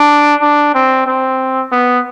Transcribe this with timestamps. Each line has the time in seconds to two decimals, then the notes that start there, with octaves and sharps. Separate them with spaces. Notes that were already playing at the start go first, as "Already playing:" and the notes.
Already playing: D4
0.42 D4
0.75 C4
1.06 C4
1.72 B3